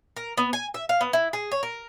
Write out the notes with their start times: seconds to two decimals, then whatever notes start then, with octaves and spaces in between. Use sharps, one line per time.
0.17 A#4
0.37 B3
0.53 G#5
0.74 E5
0.89 F5
1.01 B3
1.13 E4
1.33 G#4
1.52 C#5
1.63 A#4